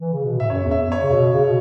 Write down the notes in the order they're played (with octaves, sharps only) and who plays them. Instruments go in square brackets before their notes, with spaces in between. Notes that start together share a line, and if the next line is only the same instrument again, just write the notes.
[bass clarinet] E3
C#3
B2
[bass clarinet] A2 [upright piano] E5
[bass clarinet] F#2 [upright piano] C#5
[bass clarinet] E2
[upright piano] E5
[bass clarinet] F#2
[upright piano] C#5
[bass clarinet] C#3
B2
C#3
B2